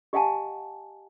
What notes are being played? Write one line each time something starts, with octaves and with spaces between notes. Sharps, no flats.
G4 D#5 F5 F#5 G#5 A5